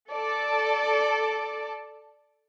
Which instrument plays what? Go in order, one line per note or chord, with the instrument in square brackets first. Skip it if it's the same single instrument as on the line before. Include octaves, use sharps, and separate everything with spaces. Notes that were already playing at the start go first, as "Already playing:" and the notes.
[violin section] A4 D5 A5